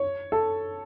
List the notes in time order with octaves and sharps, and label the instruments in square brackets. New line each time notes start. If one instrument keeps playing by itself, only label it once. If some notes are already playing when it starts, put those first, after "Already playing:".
Already playing: [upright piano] C#5
A4